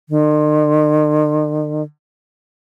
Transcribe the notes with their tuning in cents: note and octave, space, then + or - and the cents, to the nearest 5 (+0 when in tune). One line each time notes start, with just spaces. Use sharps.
D#3 -45